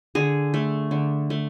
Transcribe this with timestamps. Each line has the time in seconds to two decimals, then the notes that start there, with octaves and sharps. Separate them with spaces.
0.15 D3 G#4
0.54 A3
0.91 D3
1.30 A3